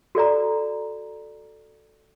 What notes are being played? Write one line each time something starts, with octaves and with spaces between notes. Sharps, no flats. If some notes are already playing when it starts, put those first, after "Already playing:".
F#4 A4 D5 A#5